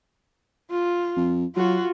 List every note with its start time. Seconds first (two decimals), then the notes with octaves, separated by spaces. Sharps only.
0.72 F4
1.16 F2
1.56 F#3 F4 F#4